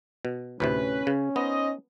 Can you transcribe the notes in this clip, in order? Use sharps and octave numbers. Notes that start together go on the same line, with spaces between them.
B2
D2 A2 C3 C#4 B4
C#3
B3 D#4 C5 D#5